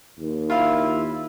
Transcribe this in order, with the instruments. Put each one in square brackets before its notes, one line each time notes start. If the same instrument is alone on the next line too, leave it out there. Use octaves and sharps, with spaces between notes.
[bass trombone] D#2
[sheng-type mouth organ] E4 [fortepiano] F4 F5